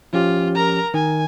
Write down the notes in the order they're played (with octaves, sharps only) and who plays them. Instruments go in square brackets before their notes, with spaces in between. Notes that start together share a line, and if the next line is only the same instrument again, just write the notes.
[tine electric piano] F3 C#4 G4 [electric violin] F4
[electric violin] A#4 A#5
[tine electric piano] D#3 [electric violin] G#5